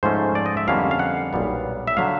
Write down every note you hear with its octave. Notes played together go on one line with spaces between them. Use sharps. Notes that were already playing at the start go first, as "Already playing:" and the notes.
G#2 F3 A3 C#4 C5
D5
D#5
E5
F2 D3 G3 A#3 C#4 F5
F5
F#5
B1 A#2 G3 B3
E5
D3 F#3 F5